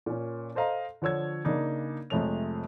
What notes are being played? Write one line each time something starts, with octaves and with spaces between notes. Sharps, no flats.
A#2 C#4
A4 C5 D#5 F5 A#5
D3 F3 C#5 E6 G#6
C#3 A#3 D4 D#4
F2 C3 G#3 A3 C#5 F7